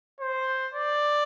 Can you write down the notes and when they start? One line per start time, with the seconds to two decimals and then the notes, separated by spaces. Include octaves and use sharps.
0.21 C5
0.74 D5